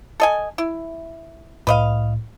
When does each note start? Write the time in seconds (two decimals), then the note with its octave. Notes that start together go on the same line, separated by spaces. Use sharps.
0.20 A4 D#5 G#5
0.58 E4
1.67 C2 A2 B4 D#5 F5